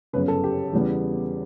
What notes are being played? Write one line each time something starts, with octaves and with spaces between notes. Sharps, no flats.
G1 F#2 C#3 B4
A4
G4
E2 C#3 G3 B3